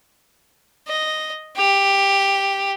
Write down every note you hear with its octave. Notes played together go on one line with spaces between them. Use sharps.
D#5
G4